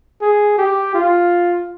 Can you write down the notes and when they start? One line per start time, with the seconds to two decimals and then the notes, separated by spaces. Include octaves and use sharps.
0.22 G#4
0.58 G4
0.95 F4